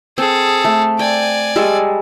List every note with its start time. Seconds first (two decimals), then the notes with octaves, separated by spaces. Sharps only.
0.18 C4 G#4 A4
0.65 A3
0.99 D5 G5 G#5
1.56 G3 G#3 A4